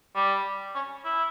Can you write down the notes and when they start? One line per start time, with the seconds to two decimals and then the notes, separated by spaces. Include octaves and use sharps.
0.16 G3
0.75 C#4
1.05 E4